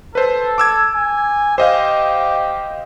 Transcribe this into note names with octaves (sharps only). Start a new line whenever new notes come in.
A4 B4 C5
D6 E6 G#6
G#5
G4 C5 D#5 F5